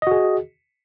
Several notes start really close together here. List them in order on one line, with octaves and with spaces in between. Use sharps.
D#5 F#4 G#4